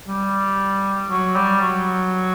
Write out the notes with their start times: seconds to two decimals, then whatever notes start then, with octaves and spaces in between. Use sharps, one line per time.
0.07 G3
1.10 F#3
1.36 G3
1.61 F#3